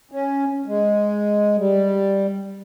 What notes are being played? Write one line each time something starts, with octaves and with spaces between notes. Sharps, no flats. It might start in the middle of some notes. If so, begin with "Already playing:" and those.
C#4
G#3
G3